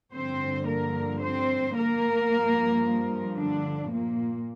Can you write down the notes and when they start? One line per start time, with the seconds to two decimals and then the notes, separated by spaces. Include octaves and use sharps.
0.13 G2 D3 F3 C4 C5
0.67 A#3 A#4
1.21 C4 C5
1.75 A#3 A#4
2.29 G2 F3
3.37 D3 D4
3.90 A#2 A#3